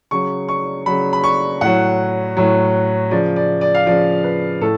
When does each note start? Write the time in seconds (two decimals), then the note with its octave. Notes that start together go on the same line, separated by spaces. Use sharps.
0.11 C#3 F#3 C#6
0.49 C#6
0.86 C#3 F#3 B5
1.13 B5
1.24 C#6
1.61 A2 F#3 F#5
2.37 A2 F#3
3.11 C#3 F3 D5
3.36 D5
3.61 D5
3.75 F5
3.86 C#3 F3 D5
4.24 B4
4.61 A2 A4